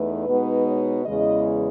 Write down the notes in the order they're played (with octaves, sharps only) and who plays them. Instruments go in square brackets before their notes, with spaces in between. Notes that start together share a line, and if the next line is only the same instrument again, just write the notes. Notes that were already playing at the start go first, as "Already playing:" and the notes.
Already playing: [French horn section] E2 A3 D#4 B4
B2 G#3 B3 D#4
C#5
E2 C#3 E3 G#3 D#5